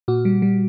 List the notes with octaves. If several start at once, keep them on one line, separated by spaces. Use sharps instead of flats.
A#2 F#4
G3
G3